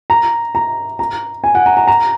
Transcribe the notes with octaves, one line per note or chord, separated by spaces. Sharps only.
A#5
A#5
A#5
G#5
F#5
A#5
A#5
A#5